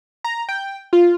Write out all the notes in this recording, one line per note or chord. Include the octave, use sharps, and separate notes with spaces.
A#5
G5
F4